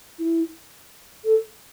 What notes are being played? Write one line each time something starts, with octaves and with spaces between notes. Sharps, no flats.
E4
A4